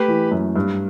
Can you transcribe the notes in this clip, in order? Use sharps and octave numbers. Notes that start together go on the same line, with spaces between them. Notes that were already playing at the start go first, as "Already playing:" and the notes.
Already playing: A3 G4 B4
E3
F#2
G2